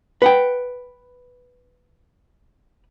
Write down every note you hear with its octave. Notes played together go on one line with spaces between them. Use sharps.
B4 F#5 G5